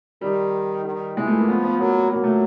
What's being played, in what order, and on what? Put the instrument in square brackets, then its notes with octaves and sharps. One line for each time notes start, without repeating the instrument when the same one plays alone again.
[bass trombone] D#3 [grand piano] G3
[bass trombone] D#3
[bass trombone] E3 [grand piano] G#3
[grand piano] A3
A#3
[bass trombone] F3 [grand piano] B3
[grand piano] B3
[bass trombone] F#3 [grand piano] A#3
[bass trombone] F#3 [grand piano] A#3
[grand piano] A3